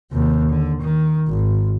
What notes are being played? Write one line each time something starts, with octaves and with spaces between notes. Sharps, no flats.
D#2 C3
D3
D#3
G#1